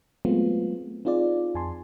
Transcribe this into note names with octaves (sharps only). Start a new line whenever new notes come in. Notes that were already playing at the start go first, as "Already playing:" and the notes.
F#3 G#3 A3 B3 C4 F4
C4 D#4 F4 G#4 D5
F2 G#5 A5 C6